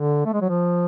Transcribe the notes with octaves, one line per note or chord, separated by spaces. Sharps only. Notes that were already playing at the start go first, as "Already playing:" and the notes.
Already playing: D3
A3
G#3
F#3
F3